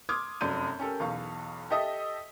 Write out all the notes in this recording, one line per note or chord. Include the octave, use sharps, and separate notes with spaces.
C6 D6 D#6 F6 G#6
F1 F#2 D5 G6 D#7
C#4 G4 A4 A#4
B1 E2 F5 C#6
G4 A4 D#5 E5 D#6